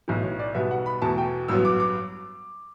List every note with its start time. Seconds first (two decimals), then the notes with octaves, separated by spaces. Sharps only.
0.08 B1 A2 E3
0.23 C#5
0.39 D5
0.54 B1 B2 G3 B3 E5
0.71 F#5
0.86 B5
1.01 E2 B2 A3 A5
1.18 G5
1.48 A1 G2 F#3 B3 E6
1.65 D6
1.80 D6